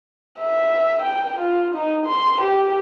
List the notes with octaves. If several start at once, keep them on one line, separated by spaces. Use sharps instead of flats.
E5
G5
F4
D#4
C6
G4